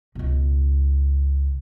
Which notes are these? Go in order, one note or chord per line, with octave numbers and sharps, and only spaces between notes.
C#2 B2